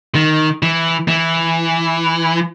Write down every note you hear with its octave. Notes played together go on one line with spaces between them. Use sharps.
D#3
E3
E3